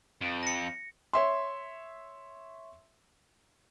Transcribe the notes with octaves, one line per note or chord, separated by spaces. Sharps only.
F2
A#6 C#7
C#5 E5 C6